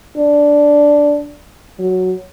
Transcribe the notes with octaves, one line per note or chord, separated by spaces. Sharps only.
D4
F#3